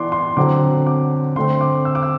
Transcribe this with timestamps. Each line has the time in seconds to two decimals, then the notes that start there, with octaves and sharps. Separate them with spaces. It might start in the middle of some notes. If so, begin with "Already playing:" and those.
Already playing: E3 B3 D4 C6 D6
0.12 C6
0.37 D3 F#3 C4 D6
0.87 D6
1.36 D3 A3 C4 C6
1.61 D6
1.85 E6
1.95 D6
2.03 E6